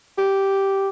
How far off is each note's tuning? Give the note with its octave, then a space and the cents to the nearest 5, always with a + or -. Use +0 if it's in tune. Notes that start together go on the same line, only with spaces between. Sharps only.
G4 -5